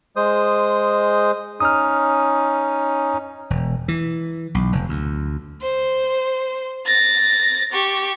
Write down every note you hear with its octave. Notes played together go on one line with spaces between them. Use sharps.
G#3 C5 D#6
C#4 D#4 D#6 F6
E1
E3
B1
F1
D2
C5
A6 A#6
G4 C#6